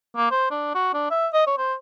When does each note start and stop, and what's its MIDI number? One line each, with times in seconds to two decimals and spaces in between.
0.16 0.29 58
0.31 0.47 72
0.51 0.73 62
0.75 0.90 66
0.94 1.11 62
1.11 1.27 76
1.33 1.44 75
1.47 1.56 73
1.58 1.74 72